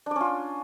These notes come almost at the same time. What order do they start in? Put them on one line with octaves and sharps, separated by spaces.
D4 D5 C#4 F4